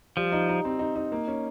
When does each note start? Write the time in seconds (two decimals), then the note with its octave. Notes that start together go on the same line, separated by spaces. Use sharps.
0.17 F3 G3
0.32 D#4
0.49 D#4
0.65 C4
0.79 D#4
0.96 D#4
1.12 A#3
1.28 C#4